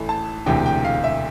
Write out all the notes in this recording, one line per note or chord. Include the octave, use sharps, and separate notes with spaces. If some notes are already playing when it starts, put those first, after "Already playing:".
Already playing: A1 A2 E3 A3
A5
E1 D2 C3 E3 G5
G5
F5
E5